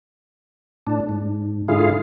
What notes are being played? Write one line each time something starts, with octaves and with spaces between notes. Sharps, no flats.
A2 D4
G#2
G#2 D3 E4 F4 G#4 F5